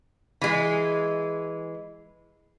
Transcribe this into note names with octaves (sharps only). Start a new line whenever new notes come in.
E3 G#3